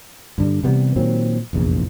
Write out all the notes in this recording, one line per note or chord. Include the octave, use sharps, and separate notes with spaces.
G2 D3 G3
C3 E3 G3 B3
A#2 D#3 F#3 C4
F1 A#1 E2